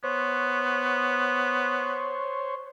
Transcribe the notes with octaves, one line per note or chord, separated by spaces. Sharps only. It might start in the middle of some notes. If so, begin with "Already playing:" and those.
B3 C5 C#5